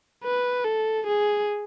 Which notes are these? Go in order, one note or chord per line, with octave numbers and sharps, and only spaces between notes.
B4
A4
G#4